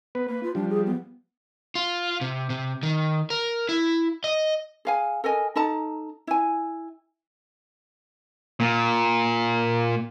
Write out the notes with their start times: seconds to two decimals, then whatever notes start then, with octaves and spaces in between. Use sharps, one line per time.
0.15 B3 B4
0.28 A#3 B4
0.43 F4
0.55 F3 G3 D4
0.70 G#4
0.86 B3
1.75 F4
2.21 C3
2.50 C3
2.83 D#3
3.30 A#4
3.69 E4
4.24 D#5
4.85 G#4 F5 G#5
5.24 A4 A#4 D#5 G#5
5.56 D#4 A4 A5 A#5
6.27 E4 G#5
8.60 A#2